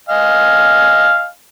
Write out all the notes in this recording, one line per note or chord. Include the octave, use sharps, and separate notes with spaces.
D#5 F5 G#5